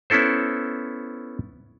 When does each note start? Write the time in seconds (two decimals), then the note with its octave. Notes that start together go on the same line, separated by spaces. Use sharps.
0.10 B3 C#4 E4 A4 C5